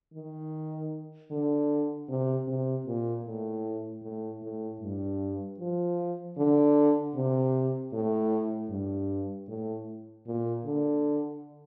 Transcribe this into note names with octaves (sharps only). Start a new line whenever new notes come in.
D#3
D3
C3
C3
A#2
A2
A2
A2
G2
F3
D3
C3
A2
G2
A2
A#2
D3